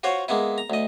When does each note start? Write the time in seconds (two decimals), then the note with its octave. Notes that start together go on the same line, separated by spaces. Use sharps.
0.03 F4 F#4 C5 C#5
0.28 G#3 A#3 B3 E4
0.58 A#5
0.70 D2 D#5